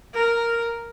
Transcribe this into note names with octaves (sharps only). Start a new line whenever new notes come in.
A#4